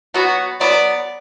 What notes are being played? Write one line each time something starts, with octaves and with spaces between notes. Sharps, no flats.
F#3 B3 F#4
F#3 B3 D5